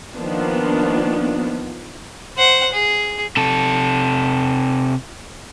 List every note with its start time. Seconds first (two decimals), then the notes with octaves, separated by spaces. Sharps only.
0.14 D#3 F3 A#3 B3 D4 F4
2.37 C5 F#5
2.73 G#4
3.37 C3 A4